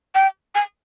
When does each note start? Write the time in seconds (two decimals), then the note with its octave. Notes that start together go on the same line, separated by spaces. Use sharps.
0.15 G5
0.55 G#5